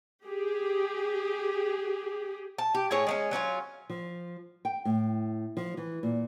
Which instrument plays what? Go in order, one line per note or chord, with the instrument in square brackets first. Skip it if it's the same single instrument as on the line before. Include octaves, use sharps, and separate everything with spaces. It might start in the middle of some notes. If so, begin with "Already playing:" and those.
[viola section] G4 G#4
[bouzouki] A5
G4
A2 E4 G#4 C#5
G#3 A3 C#4
F#3 C#4 D4 F4
[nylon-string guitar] F3
G5
A2
F3
E3
A#2